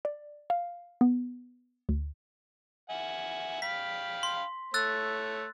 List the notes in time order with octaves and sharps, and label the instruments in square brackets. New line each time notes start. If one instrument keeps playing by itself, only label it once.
[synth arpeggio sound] D5
F5
B3
D2
[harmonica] E5 F#5 G#5
[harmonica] F5 G5 B5 [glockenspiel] B6
[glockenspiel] C6
[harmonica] A3 C#5 [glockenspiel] E6 F#6 A6